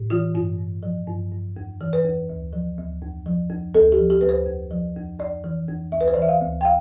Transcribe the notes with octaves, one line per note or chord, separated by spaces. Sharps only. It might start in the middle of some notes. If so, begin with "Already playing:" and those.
Already playing: A2
E3 F4
G2 F4
G2
F3
G2
G2
F2
E3
B4
F2
D2
F3
D2
F2
F3
F2
D2 A4
G4
F3
G4
D2 B4
C5
F2
F3
F2
F2 D5
E3
F2
D2 E5
B4
C5
D5
E3 E5
F5
D2
G5
F5